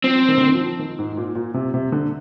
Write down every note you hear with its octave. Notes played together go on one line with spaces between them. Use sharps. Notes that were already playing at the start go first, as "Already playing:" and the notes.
F3 C4
D#3
D3
D#3
F3
D#3
G#2
G#2
A#2
A#2
C3
C3
D3